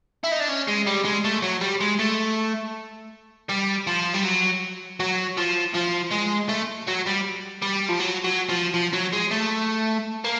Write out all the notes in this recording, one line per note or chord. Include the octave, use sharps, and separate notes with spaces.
E4
D#4
D4
C#4
G#3
G3
G#3
A3
F#3
G3
G#3
A3
G3
F3
G3
F#3
F#3
F3
F3
G#3
A3
F#3
G3
G3
F3
F#3
F#3
F3
F3
F#3
G#3
A3
A#3